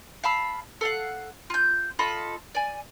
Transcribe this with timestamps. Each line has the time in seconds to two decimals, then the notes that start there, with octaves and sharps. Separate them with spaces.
0.24 F5 A5 B5 E6
0.81 A4 F5 F#5
1.50 F4 G6
1.99 F4 A4 D#5 B5
2.55 D5 G#5